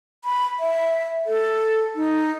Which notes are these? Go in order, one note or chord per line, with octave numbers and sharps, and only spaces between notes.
B5
E5
A4
D#4